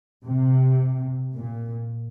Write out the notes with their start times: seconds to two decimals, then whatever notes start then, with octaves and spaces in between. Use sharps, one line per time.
0.24 C3
1.34 A#2